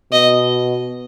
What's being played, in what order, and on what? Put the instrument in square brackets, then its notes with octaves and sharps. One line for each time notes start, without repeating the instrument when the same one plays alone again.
[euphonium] B2 [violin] D#5